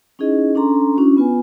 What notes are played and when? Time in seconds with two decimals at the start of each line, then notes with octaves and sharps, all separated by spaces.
0.19 C#4 D#4 E4 G#4 D#5
0.55 C#4 D4 A4 A#5 C6
0.97 C#4 D4 E4 F#4
1.17 B3 F4 B4 G#5